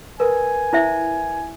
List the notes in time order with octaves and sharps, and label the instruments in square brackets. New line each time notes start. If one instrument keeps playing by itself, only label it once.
[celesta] A#4 B4 [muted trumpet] G#5
[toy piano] E4 C5 E5